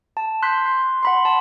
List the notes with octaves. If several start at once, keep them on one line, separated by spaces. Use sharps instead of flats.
A5
C6 F#6 G6 B6
C6
F#5 B5 C6
A5